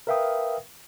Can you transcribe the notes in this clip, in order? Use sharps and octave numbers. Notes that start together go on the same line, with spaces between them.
A#4 B4 E5 F5 G5 D#6